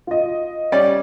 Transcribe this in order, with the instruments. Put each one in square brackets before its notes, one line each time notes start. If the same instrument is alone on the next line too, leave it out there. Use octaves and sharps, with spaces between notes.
[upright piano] F4 D#5
[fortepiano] G3 C#4 D5